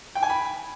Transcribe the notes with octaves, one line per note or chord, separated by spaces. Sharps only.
G5
G#5
B5